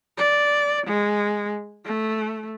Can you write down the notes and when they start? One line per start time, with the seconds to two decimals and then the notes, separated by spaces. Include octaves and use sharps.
0.18 D5
0.87 G#3
1.85 A3